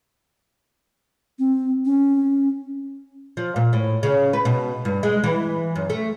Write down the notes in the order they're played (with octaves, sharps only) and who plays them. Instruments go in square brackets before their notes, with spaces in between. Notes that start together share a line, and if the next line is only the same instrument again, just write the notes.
[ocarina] C4
C#4
[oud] F3
A#2
A2
C#3
B4
B2
G2
G#3
E3
F#2
A3